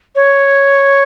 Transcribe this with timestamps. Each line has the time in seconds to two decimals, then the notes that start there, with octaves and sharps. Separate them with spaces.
0.16 C#5